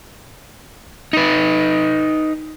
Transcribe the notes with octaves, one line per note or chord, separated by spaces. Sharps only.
D#4 B4